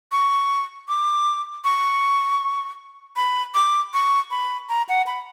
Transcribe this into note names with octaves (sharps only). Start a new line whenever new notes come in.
C#6
D6
C#6
B5
D6
C#6
B5
A#5
F#5
B5